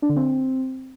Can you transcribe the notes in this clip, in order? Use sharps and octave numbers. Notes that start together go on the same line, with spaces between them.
D4
D3
C4